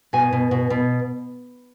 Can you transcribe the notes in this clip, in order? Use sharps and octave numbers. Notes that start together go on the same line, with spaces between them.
B2 G#5
B2
B2
B2